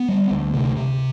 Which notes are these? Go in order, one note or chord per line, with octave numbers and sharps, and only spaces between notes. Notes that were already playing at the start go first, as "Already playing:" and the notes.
Already playing: B3
G3
D2
C3
C3